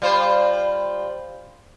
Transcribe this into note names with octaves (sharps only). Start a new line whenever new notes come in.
G3 F4 C5